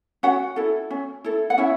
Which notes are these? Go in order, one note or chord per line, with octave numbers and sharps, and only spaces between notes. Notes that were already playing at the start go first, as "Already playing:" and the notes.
C#4 F#4 F#5
E4 A4
C#4
E4 A4
F#5
C#4 E4 E5